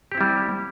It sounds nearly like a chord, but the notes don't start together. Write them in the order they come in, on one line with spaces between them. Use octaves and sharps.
G4 C4 E4 G3